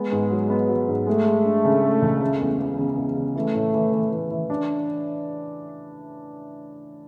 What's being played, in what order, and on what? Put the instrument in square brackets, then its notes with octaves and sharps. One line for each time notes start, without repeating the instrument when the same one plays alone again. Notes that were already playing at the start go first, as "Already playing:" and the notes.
Already playing: [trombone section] G#3 [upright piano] B3
[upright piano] G#2
F#3
B3
F#3
G#2
[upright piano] G#3 [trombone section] A3
[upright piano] G#3
D4
C#3
G#3
C#2
C#3
E2
E2
C#3
E2
C#3
[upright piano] E3 [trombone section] A3
[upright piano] A2
E3
E3
E3
E3
D4